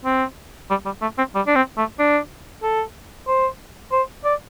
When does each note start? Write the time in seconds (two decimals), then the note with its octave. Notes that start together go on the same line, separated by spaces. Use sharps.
0.05 C4
0.70 G3
0.85 G3
1.02 A3
1.18 C4
1.35 G3
1.47 D4
1.55 C4
1.77 A3
1.99 D4
2.63 A4
3.27 C5
3.92 C5
4.24 D5